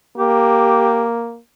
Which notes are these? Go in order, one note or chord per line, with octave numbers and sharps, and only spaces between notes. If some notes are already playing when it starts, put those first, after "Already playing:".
A#3 G4